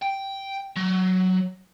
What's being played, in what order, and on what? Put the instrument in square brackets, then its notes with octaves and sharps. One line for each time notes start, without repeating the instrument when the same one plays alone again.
[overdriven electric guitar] G5
F#3